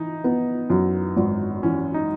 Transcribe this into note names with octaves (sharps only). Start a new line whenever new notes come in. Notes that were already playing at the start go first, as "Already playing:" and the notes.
Already playing: E3 D#4
B3
F#2
G#1
E3 C#4
D#4